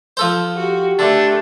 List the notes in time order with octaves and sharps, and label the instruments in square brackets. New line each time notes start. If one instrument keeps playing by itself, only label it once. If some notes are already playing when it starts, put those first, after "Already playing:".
[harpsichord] F3 A4 C5
[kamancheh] F#4 [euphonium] G4
[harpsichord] D3 [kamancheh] A3 A4 [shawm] D4